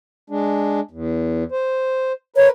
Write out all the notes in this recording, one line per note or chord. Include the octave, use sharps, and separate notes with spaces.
G#3 D4
E2
C5
A#4 B4 C#5